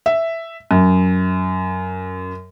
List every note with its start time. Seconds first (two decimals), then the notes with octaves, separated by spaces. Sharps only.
0.06 E5
0.71 F#2